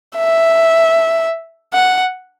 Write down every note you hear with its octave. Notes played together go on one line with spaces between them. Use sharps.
E5
F#5